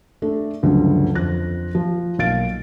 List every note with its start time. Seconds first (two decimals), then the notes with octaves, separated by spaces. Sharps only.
0.22 A3 D4 A4
0.63 D2 G2 C#3 F3 F#3
1.15 F2 F#6 A#6
1.75 F3
2.18 B1 A#3 F5 A6 D7